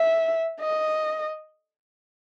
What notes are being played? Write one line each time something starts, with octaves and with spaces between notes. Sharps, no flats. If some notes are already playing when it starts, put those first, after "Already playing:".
Already playing: E5
D#5